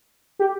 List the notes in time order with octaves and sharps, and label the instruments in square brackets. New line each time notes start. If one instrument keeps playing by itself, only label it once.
[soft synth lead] G4